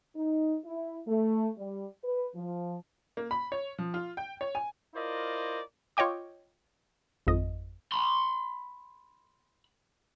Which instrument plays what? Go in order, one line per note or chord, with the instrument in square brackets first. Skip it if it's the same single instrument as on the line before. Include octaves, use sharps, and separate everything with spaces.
[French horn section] D#4
E4
A3
G3
B4
F3
[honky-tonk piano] A#3
B5
C#5
F3
F4
G5
C#5
G#5
[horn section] E4 F4 A#4 C5 D5 D#5
[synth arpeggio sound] F4 C#5 D#5 G5 D6
G#1 F2 D#5
[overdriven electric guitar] B5 C6